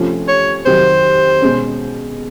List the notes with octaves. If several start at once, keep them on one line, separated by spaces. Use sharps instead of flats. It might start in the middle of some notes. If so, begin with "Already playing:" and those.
Already playing: C3 F3 A3 C#4 F4
C#5
F2 C3 D#3 F#3 C5
B2 G#3 C#4